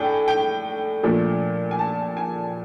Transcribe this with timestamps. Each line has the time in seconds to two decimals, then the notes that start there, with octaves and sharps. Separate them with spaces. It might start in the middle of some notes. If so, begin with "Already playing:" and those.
Already playing: A2 D4 G5 G#5
0.28 G5
1.03 A#2 F3 A3 D4
1.71 G#5
1.79 A5
2.17 G#5